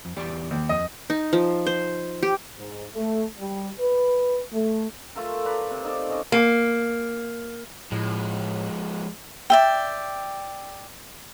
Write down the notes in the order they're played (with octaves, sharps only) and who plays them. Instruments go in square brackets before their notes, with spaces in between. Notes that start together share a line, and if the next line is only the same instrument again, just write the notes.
[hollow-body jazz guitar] F2
E2 G4 D5
[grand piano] D#2
[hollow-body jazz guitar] F2 [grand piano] D#5
[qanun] D#4
F3
C5
G4
[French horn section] G#2
A3
G3
B4
A3
[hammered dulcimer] A3 F4 A4 A#4
B4 D5 A#5
C3
D#4 A4 D5
C#4 D#5 D6
[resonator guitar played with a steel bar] A#3
[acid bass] A2 [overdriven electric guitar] F3 G#3
[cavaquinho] D5 E5 G5